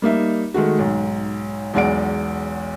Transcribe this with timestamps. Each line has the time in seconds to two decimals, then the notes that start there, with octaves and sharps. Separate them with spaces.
0.02 G3 A#3 D#4 E5
0.54 D#3 G#3 A3 F#4
0.79 B1 G#2
1.74 B1 E2 G#3 D5 F#5 D7